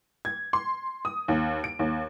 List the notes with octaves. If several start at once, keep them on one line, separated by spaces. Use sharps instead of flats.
G#6
C6
D#6
D#2
D7
D#2